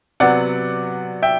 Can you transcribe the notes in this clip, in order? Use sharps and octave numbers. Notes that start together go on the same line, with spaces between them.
C3 F#3 B3 D5 F#5
E5 G5